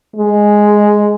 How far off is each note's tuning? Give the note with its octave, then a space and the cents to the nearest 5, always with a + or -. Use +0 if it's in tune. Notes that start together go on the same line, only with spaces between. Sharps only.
G#3 +0